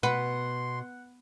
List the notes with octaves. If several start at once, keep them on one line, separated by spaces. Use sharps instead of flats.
B2 B4 F#5 C6